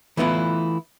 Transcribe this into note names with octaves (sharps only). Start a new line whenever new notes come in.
E3 A3 B3 E4 F4